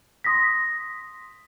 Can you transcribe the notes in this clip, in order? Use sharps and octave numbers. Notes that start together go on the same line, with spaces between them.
C6 D#6 A#6 B6